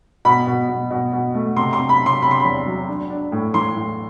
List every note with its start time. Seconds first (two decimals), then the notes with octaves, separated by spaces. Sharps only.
0.25 B2 B5
0.47 B2
0.69 B2
0.91 B2
1.12 B2
1.34 A3
1.56 C3 C6
1.73 C6
1.78 C3
1.89 B5
2.01 C3
2.06 C6
2.22 C3 B5
2.31 C6
2.40 E2 B5
2.66 F#3
2.88 D4
3.10 D4
3.32 A2
3.54 E3 C6
3.76 A2